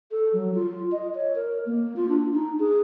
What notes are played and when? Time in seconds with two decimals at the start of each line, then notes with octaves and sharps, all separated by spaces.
0.11 A4
0.33 F#3
0.55 F4
0.92 D#5
1.15 C#5
1.35 A#4
1.66 A#3
1.96 F4
2.09 D4
2.33 D#4
2.59 G#4